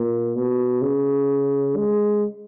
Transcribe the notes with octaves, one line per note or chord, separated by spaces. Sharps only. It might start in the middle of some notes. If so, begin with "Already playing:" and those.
Already playing: A#2
B2
C#3
G#3